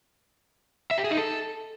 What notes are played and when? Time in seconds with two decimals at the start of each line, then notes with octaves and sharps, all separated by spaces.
0.91 E5
0.98 G4
1.04 G#4
1.11 D#4
1.18 A4